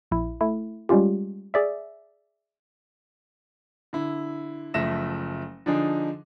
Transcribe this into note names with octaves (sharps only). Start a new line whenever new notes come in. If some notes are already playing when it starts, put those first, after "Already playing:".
A#1 E4
A3 E4
G3 G#3 C#4 F4 G4
G#4 D5 E5
D3 E4
F#1 F3 A3 E5 A#6 E7
D3 F3 D4 D#4 G#4